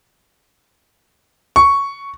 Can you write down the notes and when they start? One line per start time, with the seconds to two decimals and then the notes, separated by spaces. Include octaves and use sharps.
1.56 C#6